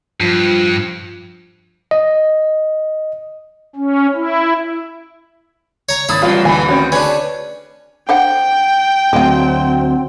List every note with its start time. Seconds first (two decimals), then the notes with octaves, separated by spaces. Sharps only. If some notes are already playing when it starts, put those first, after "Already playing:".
0.20 G2 F3
1.91 D#5
3.76 C#4
4.15 E4
5.89 C#5 A#5
6.09 G#1 E4 D#6 A6
6.22 A1 F#3 G3 C4 F4 B4 F5
6.45 D2 B2 E3 G#3 G#5 B5
6.68 D#3 C4 C#4 F#4
6.92 C#4 D4 G#4 B4
8.09 D4 C5 F#5 G5
9.13 D2 F#3 G#3 C4 F4